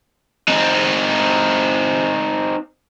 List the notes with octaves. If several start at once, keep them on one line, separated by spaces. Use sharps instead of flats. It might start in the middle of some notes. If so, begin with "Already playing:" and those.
C4 D#4